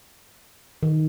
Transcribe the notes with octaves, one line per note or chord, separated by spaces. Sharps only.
D#3